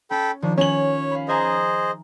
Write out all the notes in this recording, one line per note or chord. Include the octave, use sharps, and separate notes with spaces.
C#4 A4 G5 B5
D#3 F3 D4
C#4 C#5 F#7
F5 B5
G#4 C5 D#5 E5 G#5 A#5